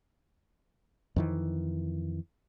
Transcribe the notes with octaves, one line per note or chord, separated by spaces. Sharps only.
F2 D#3 E3